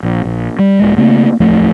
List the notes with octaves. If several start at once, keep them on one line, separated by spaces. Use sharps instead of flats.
A#1
A#1
G3
D#1 G#3
C#3 A3 A#3 C4
D1 E2 F3 A3